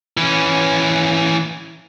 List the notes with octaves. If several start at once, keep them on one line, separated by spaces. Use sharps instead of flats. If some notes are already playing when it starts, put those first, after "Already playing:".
E3 C#4